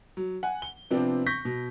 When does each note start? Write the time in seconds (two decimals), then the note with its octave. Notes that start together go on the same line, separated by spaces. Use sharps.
0.17 F#3
0.43 F#5 G#5
0.62 G7
0.91 C3 F3 B3 C4 D4
1.26 C#6 G6 A#6 B6
1.45 B2